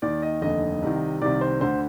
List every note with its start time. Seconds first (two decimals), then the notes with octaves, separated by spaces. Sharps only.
0.02 D#2 D#3 D5
0.22 D#5
0.41 F1 D#2 D3 D#5
0.82 C2 C3 D#3
1.22 C2 C3 D#3 D5
1.41 C5
1.61 D2 D3 C5